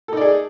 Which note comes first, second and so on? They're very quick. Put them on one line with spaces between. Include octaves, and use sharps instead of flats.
A4 D#4 D5 G#4